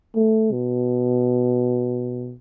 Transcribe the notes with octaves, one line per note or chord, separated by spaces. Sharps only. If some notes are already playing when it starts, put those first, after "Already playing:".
A3
B2